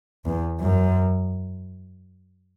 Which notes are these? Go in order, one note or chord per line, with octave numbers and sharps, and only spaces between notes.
E2
F#2